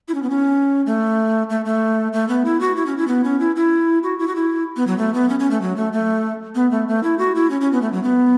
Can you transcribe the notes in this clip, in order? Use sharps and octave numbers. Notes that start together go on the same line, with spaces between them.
E4
C#4
B3
C#4
A3
A3
A3
A3
B3
E4
F#4
E4
C#4
E4
B3
C#4
E4
E4
F#4
E4
F#4
E4
B3
F#3
A3
B3
C#4
C#4
A3
F#3
A3
A3
B3
A3
A3
E4
F#4
E4
C#4
C#4
B3
A3
F#3
B3